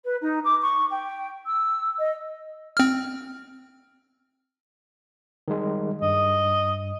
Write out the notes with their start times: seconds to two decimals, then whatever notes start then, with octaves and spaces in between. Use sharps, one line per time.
0.03 B4
0.21 D#4
0.44 D6
0.62 C#6
0.90 G5
1.46 E6
2.00 D#5
2.77 C4 F6
5.48 D#3 G3 G#3
6.02 G2 D#5